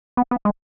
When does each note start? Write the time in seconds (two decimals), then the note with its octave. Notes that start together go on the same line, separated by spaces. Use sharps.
0.17 B3
0.31 B3
0.45 G#3